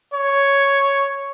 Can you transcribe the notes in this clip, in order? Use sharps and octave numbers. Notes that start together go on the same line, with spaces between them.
C#5